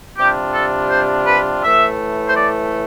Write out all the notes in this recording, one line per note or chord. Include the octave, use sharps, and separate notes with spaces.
C3 G3 D4 F4 G4
A4
C5
B4
A2 E3 A3 E5
C5
D5